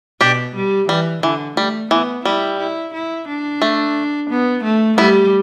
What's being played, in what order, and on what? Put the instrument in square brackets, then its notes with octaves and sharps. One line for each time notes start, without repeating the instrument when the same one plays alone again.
[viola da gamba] B2 [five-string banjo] D4 G4
[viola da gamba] G3
[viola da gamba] E3 [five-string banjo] G3
[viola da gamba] D3 [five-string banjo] E3
[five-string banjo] G3 [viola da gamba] A3
[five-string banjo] E3 [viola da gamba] B3
[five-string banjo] G3 [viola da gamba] E4
[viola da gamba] E4
E4
D4
[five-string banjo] A3
[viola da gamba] B3
A3
[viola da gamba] G3 [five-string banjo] B3 E4